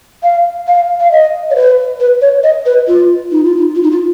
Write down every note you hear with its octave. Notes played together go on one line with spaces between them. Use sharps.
F5
F5
F5
D#5
C#5
B4
B4
C#5
D#5
B4
F4
D#4
F4
D#4
F4
D#4
F4